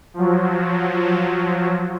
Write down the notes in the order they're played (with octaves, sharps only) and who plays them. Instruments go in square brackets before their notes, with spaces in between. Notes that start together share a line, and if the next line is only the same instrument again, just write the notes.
[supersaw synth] F3 F#3